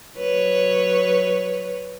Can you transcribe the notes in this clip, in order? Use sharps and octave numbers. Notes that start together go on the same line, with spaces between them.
F#3 B4 C#5